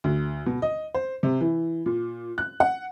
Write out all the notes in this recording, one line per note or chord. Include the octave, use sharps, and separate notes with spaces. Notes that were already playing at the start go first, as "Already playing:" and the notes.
D2
B2
D#5
C5
C3
E3
A#2
F#6
F#5